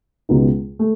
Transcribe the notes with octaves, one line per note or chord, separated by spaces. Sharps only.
C#2 B2 G#3 B3 D#4
A3